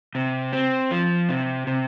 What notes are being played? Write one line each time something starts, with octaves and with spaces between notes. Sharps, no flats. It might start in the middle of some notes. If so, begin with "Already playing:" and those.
C3
C4
F3
C3
C3